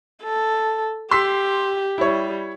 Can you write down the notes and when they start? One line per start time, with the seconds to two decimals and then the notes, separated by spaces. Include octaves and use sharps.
0.24 A4
1.11 G4 C6 E6 B6
1.98 G3 E4 C#5